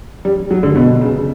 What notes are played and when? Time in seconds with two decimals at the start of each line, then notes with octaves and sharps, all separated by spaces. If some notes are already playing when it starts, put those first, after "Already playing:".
0.25 G3
0.51 F#3
0.63 D3
0.76 B2
1.01 C#3